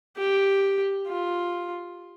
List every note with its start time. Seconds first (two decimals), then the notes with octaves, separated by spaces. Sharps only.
0.17 G4
1.08 F4